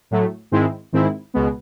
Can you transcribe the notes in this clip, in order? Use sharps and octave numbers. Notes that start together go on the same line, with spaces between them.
A2 F#3 A3
G#2 D#3 G#3 C4 E4
G#2 D#3 G#3 C4 E4
C#2 B2 G#3 B3